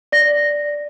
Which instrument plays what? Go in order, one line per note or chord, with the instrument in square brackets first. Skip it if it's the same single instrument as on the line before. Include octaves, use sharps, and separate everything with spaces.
[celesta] D5 A#6